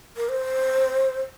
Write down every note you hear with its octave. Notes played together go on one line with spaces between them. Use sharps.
A#4
C5